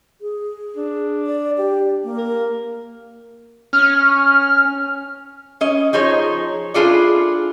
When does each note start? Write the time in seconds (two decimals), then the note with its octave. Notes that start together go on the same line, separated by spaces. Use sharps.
0.21 G#4
0.76 D4
1.27 D5
1.58 G4
2.04 A#3
2.18 A#4
3.73 C#4 F6
5.61 C#4 D#5
5.93 F3 D#4 G#4 C5 C#5
6.74 D4 E4 F4 G#4 A4 D5